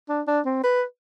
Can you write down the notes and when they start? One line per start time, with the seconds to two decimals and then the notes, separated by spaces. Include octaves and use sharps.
0.09 D4
0.27 D4
0.46 C4
0.63 B4